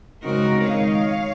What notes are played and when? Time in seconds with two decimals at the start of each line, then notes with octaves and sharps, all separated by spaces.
0.22 C#3 G#3 C4 D#4 F#4 A#4
0.65 D#3 G#3 D#4 C#5 F5